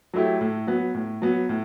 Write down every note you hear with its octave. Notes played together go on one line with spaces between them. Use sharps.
F#3 A3 E4 G4
A2
F#3 B3
A2
F#3 B3
A2